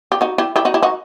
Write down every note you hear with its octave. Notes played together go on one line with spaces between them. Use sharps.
G4
D#4 F#4
E4 G4
E4 G4
D#4 F#4
E4 G4
D#4 F#4